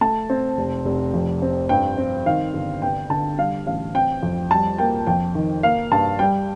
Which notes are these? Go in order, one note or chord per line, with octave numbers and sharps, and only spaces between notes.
A3 A5
C4
F1
F1
F2
C4
G2 G5
C4
D#3 F5
G1
G2 G5
D3 A5
G3 F5
A1 F5
C4 G5
F2
G3 A5
A#3 G5
F2 G5
D#3
A#3 F5
G2 A5
G3 G5